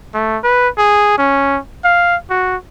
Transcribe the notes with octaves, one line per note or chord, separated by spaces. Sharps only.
A3
B4
G#4
C#4
F5
F#4